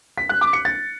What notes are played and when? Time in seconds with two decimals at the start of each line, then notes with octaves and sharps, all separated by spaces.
0.18 B6
0.29 F#6
0.41 D6
0.53 C#7
0.65 A6